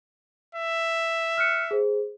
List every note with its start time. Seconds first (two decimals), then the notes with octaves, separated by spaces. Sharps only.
0.55 E5
1.37 F6 F#6 C#7
1.71 G#4 C5